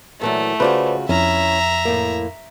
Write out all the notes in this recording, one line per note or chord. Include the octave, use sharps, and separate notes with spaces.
A#2 E3 F#3 A3
C#3 F4 F#4 B4 C5 D5
F2 C#4 E4 E5 A#5
A2 A#3